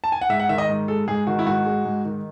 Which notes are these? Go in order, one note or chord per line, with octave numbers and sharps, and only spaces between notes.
A5
G#5
F#5
G#2 E5
F#5
D#3 E5
D#5
G#2
G#3 A4
G#2 G#4
D#3 F#4
E4
G#2 F#4
G#3
G#2
D#3